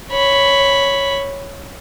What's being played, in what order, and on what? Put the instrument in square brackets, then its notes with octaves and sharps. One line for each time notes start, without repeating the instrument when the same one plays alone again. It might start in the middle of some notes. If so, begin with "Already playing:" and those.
[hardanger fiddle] C#5 B5